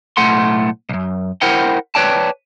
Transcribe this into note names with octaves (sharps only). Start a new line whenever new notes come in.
B1 A2 A3 F#5 C6
B1 F#2
E4 A#4 C5 F#5 G5
B4 C#5 D5 G5 A5